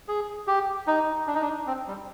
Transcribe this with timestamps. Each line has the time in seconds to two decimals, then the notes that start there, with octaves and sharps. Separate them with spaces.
0.08 G#4
0.47 G4
0.87 D#4
1.27 D4
1.35 D#4
1.41 D4
1.67 C4
1.87 G3